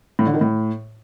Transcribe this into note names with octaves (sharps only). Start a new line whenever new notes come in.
A2
D3
D#3
A2